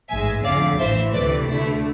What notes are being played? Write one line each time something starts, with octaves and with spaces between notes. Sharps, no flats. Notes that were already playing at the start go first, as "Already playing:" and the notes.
A1 G#2 G#3 E5 G#5
F2 D3 A3 D5 F5
A1 A2 E3 C5 E5
D2 C3 E3 A3 B4 D5
D2 D3 A3 E4